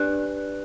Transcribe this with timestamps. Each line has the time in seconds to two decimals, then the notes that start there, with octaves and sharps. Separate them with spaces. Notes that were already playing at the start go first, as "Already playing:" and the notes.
Already playing: D4 G4 B4 D5 F#6